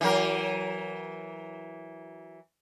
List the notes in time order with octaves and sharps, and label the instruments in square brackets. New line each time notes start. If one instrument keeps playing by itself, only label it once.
[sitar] E3 F#3 A#4